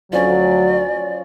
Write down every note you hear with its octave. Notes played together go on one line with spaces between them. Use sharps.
D2 F3 F#3 C#4 D5